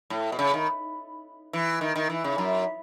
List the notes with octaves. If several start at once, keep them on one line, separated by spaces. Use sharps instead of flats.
A2
B2
C#3
D#3
E3
D#3
D#3
E3
C#3
F#2